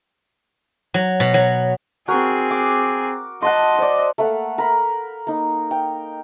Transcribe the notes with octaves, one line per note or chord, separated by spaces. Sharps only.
F#3
B2
F#3
C4 F#4 G#4 A#4 A#5
D6
D#5 F#5 A5 C6
C5 D5
A3 A#3 F5 F#5
A#4 B5
A#3 D#4
F5 G5